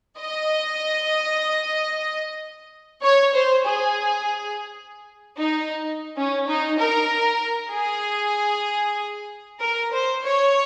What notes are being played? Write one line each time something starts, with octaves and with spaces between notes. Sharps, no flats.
D#5
C#5
C5
G#4
D#4
C#4
D#4
A#4
G#4
A#4
C5
C#5